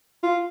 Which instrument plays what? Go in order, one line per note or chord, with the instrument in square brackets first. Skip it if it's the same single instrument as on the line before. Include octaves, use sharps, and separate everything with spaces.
[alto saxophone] F4